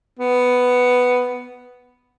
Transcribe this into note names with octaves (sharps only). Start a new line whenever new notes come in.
B3